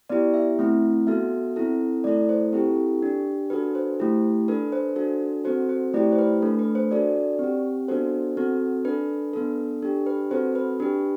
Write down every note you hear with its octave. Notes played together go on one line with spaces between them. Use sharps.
B3 E4 G4 D5
E5
A3 C4 E4
B3 F#4 A4 E5
C4 E4 A4
A3 E4 A4 D5
C5
C4 E4 G4 A4
D4 G4
D4 F#4 A4 B4
C5
A3 E4 G4
D4 A4 B4
C5
D4 F#4 A4
C4 F#4 A4 C5
C5
A3 E4 G4 D5
C5
B4
A3 D4 A4
B4
C5
D4 F#4 A4 D5
C4 G4
B3 D4 F#4 A4 C5
C4 F#4 A4
D4 A4 B4
B3 D4 A4
D4 G4 A4
B4
C4 F#4 A4 C5
B4
D4 G4 B4